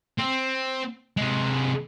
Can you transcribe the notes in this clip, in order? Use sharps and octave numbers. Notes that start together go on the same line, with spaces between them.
C4
C3 G#3